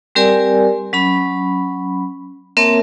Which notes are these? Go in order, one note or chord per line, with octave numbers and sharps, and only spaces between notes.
G3 C4 G4 A#4 D5 G#5
F#3 C#4 B5
A#3 C4 A#4 C#5 E5 A5